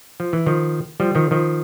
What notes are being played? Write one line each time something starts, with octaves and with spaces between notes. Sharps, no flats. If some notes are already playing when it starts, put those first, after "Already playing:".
F3
E3
D#3 F3
F3 G3
D#3 F3
D#3 F3